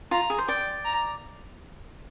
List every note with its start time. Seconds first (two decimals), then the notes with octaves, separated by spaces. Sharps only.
0.11 F4 A#5
0.30 G#4
0.38 C5
0.48 D5 G5
0.85 A#5